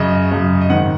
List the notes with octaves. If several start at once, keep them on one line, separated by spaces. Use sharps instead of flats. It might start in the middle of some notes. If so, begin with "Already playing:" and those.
Already playing: F#2 C#3 D#5
F#2 C#3
D#5
G#2 D#3 F#5